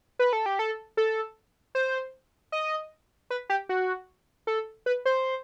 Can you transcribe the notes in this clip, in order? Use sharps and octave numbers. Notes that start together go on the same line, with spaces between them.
B4
A4
G4
A4
A4
C5
D#5
B4
G4
F#4
A4
B4
C5